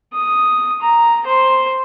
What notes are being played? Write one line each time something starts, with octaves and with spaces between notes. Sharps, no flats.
D#6
A#5
C5